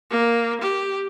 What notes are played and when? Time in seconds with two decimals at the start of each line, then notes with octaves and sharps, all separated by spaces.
0.11 A#3
0.61 G4